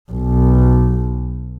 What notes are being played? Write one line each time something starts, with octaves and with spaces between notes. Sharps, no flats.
B1